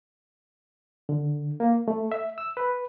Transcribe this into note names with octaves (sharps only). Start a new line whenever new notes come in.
D3
A#3
A3
E5
E6
B4